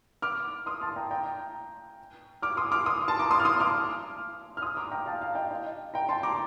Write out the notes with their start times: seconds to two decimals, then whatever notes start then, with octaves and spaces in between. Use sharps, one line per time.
0.22 D6 F6
0.66 C6 D#6
0.81 A5 C6
0.96 G5 A#5
1.11 G5 A#5
2.42 D6 F6
2.57 C6 D#6
2.72 D6 F6
2.86 C6 D#6
3.08 A5 C6
3.19 A#5 D6
3.31 C6 D#6
3.40 F6
3.45 C6 D#6
3.60 D6 F6
4.57 F6
4.62 C6 D#6
4.77 A#5 D6
4.91 G5 A#5
5.06 F5 A5
5.21 F5 A5
5.35 D#5 G5
5.51 D#5
5.94 G5 A#5
6.09 A5 C6
6.23 A#5 D6